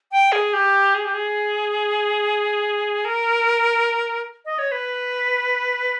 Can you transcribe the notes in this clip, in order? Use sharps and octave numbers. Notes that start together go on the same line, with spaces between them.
G5
G#4
G4
G#4
G4
G#4
A#4
D#5
C#5
B4